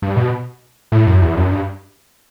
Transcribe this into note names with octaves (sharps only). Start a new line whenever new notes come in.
G2
B2
A2
F#2
E2
F#2
G2